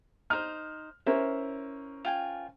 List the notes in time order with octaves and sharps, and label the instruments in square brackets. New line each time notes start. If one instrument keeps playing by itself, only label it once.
[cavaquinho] D#4 C5 [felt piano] F6
[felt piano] C#4 A#4 C5 [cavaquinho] E4
[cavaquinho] F4 G5 G#5